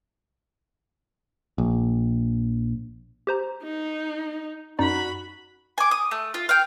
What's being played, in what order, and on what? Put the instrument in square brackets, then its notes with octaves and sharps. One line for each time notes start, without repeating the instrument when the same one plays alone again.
[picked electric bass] A#1
[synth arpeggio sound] G4 C5 A#5
[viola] D#4
[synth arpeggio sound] F#2 D#4 D5 [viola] F#4 B5
[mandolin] G#5 D6
D#6
A3
F4
F5 G5